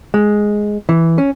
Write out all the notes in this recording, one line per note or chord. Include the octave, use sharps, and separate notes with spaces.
G#3
E3
C#4